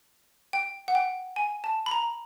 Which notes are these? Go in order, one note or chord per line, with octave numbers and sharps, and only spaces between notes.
G5
F#5
G5
G#5
A5
B5
A#5